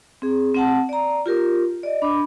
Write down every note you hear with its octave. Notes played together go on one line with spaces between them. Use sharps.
C4 G#4
C4 F#5 A5
D5 A#5
F4 G4 A#4
D5 D#5
D4 B5 D6